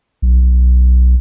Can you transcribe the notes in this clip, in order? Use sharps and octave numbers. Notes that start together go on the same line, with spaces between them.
B1